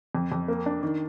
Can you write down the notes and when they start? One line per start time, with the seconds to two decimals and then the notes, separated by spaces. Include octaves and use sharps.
0.15 F2
0.32 F2
0.48 A#3
0.66 D4
0.83 D#3